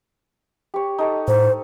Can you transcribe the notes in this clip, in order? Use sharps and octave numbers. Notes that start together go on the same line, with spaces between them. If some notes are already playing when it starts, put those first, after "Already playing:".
G4 C#5
D#4 A4 C#5
A2 C5